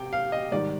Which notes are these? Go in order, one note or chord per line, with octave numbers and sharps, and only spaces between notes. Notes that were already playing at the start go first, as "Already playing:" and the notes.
Already playing: C3 G5
F5
D#5
G#2 D#3 G3 D5